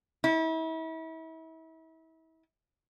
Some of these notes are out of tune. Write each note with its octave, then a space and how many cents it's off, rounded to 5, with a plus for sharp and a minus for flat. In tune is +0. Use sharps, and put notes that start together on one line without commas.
E4 -35